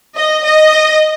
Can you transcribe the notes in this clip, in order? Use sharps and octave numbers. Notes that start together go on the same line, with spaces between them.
D#5
D#5